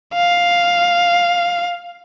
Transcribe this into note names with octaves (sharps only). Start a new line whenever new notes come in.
F5